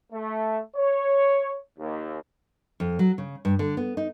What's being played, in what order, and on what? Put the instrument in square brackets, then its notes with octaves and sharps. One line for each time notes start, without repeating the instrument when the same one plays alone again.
[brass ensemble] A3
C#5
D#2
[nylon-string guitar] F2
F#3
C#3
G2
D3
B3
D#4